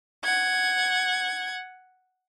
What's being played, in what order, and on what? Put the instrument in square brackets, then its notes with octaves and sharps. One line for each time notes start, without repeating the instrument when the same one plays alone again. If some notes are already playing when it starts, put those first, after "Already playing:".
[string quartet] F#5 G#6